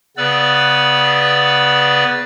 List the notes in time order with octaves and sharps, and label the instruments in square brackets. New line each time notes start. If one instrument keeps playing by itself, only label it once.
[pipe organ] C#3 B3 B4 D5 E6